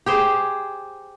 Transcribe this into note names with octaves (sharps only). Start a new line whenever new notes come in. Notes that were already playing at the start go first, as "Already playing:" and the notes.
G4 G#4 C5